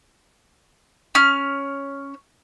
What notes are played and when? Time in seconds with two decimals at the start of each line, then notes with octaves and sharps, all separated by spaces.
1.15 C#4 F6